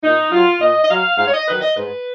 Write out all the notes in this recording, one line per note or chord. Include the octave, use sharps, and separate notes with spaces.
A#2 D#4
F#3 F4
A#2 D#5
D#5
F#3 F5
G#2 F5
C#5
D#5
D#3 F#3 B4
D#5
G#2 B4